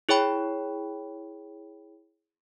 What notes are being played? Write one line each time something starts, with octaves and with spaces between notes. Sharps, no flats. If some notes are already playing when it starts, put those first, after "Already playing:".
E4 G#4 C#5 G5 B5